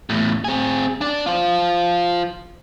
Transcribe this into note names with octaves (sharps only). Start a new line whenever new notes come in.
E2 A2
C4 G#4
D4 D5
F4 C5